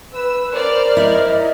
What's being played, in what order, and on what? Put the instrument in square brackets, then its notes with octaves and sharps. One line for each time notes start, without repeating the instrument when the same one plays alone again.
[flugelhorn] B4 [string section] E6
[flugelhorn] A#4 [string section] C5 D5 F6
[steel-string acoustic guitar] E4 [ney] D#5